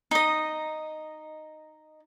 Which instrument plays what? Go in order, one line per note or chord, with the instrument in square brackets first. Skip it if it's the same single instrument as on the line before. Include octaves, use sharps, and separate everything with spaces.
[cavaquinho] D#4 D#5